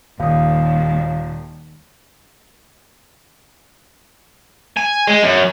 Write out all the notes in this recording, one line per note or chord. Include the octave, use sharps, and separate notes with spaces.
D#1 D#2 G3 F5 D#6
G#5
G#3
F#2